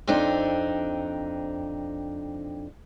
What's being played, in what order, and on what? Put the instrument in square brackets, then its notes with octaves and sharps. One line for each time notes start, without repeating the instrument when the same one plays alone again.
[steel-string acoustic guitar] F2 C4 D4 D#4